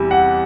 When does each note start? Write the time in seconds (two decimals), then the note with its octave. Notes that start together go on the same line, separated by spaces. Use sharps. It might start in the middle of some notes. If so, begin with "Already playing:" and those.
Already playing: E2 C3 E3 G3
0.11 F#5